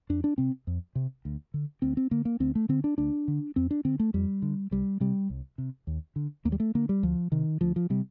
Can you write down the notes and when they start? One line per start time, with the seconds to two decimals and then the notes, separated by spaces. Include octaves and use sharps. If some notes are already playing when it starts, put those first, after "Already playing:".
0.09 F2 D4
0.24 D4
0.38 C3 C4
0.67 F2
0.95 C3
1.25 D2
1.54 D3
1.82 D2 C4
1.97 C4
2.11 D3 A#3
2.25 A#3
2.40 D2 C4
2.55 A3
2.69 D3 C4
2.84 D4
2.98 D2 D4
3.28 D3
3.56 F2 C4
3.71 D4
3.85 D3 C4
3.99 A3
4.14 F2 G3
4.42 D3
4.71 C2 G3
5.00 C3 G3
5.30 C2
5.58 C3
5.87 D#2
6.16 D3
6.45 D#2 A#3
6.52 G3
6.60 A3
6.75 D3 A#3
6.89 G3
7.03 D2 F3
7.32 C3 D#3
7.61 D2 F3
7.76 F3
7.90 C3 G3